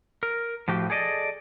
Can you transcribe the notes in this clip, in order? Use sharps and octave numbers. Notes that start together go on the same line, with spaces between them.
A#4
A2 F3 F#4 G4
G#4 A4 D5 D#5